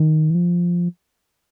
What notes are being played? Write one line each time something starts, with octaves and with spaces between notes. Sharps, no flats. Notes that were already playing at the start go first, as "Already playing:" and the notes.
Already playing: D#3
E3
F3